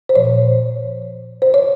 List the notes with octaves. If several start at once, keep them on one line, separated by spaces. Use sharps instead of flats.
C5
A#2 F3 C#5
C5
C#5